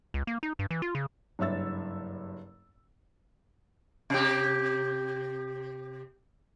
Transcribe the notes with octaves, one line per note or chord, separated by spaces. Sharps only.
C#2
A#3
D#4
G2
E3
F4
C#3
F#1 G2 C#5 E5 E6 A6
C3 G4